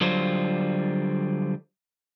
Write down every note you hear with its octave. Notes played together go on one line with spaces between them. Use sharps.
D3 F#3 G3 F4 C5